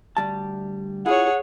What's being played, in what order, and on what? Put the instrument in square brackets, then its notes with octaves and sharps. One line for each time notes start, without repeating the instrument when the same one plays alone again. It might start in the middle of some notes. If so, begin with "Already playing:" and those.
[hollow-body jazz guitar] D2 G3 A5
[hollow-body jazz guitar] E4 F4 [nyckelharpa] G#4 C#5 [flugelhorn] F#5